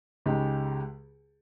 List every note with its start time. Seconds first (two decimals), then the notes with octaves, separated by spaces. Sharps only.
0.26 C#2 C#3 G#3 D#4 G4